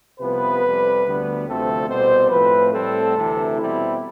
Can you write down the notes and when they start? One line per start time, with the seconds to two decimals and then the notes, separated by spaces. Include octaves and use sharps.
0.20 C2 C3 F3 B3 B4
0.63 F2 C3 G3
1.05 D2 D3 G3 B3
1.47 D2 C3 F3 A3 C4 A4
1.89 C2 B2 G3 C4 C5
2.31 A2 F3 C4 B4
2.73 A2 G3 C4 A4
3.15 D2 C3 E3
3.57 B2 G3 C4 E4